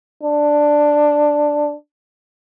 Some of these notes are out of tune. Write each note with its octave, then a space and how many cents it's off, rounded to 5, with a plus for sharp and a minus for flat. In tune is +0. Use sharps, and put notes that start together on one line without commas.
D4 +5